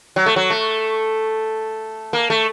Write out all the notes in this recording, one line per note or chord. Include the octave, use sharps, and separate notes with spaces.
F#3
A3
F#3
A3
A#3
A3